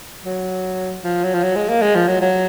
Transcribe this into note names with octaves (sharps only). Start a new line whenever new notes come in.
F#3
F3
F#3
F3
F#3
G#3
A#3
G#3
F3
F#3
F#3